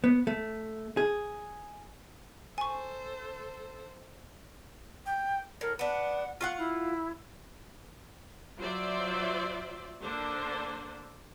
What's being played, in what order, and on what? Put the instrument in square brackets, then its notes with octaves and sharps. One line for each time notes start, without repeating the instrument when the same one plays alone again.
[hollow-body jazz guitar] B3
A3
G#4
[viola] A4 C5 [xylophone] G#5 C#6
[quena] G5
[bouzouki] A2 [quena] A#4
[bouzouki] B3 D4 [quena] F#5
[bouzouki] F4 F5 F#5 [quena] C#6
[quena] E4
[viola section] F#3 F4 C5 D5 E5
D3 A#3 D4 C5